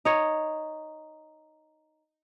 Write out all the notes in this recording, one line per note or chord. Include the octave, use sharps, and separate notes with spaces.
D#4 C#5